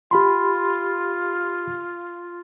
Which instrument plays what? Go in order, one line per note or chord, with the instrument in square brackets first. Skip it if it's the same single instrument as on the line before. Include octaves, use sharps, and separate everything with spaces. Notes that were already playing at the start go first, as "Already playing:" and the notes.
[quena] F4 [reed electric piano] G4 B5 C6